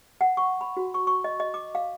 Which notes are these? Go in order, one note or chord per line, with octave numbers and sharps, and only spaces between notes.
F#5
C#6
B5
F#4
C#6
C#6
D#5
D#5
D6
F5